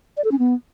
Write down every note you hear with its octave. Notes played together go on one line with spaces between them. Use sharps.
D5
A4
C#4
B3